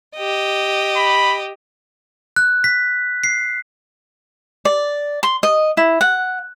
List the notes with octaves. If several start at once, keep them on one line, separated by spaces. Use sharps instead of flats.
G4 D#5
B5
F#6
B6
C7
D5
C6
D#5
E4
F#5